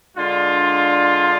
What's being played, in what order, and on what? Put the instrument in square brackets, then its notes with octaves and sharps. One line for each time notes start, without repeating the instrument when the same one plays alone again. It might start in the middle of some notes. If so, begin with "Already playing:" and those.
[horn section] D3 G#3 D4 F4